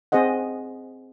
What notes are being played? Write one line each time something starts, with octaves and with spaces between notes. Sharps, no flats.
C4 G#4 C5 D#5 F#5